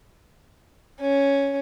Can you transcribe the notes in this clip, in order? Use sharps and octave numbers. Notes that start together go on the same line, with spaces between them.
C#4